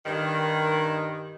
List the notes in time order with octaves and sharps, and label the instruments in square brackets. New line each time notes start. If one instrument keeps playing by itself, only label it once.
[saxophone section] G2 D#3